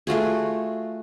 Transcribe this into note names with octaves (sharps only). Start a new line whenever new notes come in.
A3 F4 F#4 G#4